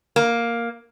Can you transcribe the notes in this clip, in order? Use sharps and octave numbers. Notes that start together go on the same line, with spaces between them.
A#3